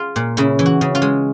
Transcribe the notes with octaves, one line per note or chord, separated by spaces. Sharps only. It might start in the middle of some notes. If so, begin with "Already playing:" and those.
Already playing: F4 G#4
A#2
C#3 E4
E3
F#4
C#3
F4
G#3